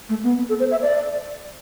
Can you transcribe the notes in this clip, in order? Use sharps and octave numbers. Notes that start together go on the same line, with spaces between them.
A3
B3
B3
A4
C5
E5
D5